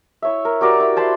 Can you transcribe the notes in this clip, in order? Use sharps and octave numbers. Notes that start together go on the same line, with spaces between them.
E4 C#5 E5
A#4
F#4 G4 A#4 D5
E4
C5 A5 B5 C6